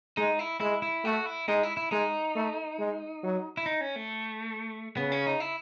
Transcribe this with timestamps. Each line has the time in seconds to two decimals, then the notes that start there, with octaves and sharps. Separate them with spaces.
0.17 G#3 D#4
0.39 E4
0.60 G#3 E4
0.82 E4
1.04 A3 F#4
1.26 E4
1.48 G#3 D#4
1.63 E4
1.77 E4
1.91 G#3 D#4
2.35 A3
2.79 G#3
3.23 F#3
3.57 E4
3.66 D#4
3.81 C#4
3.96 A3
4.97 C#3 B3
5.12 C#4
5.27 D#4
5.40 E4